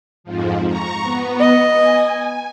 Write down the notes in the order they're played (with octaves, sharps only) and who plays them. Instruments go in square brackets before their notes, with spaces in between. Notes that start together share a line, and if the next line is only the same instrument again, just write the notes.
[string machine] F2 G#2 F3
A#5 C#6
B3
[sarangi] D#5
[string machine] G#5